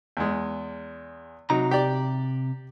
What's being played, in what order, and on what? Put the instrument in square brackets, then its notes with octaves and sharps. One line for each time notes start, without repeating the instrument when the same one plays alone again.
[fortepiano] E2 G#3
[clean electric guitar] C3 A#5 [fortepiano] F#3 D#4
[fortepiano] G4 D5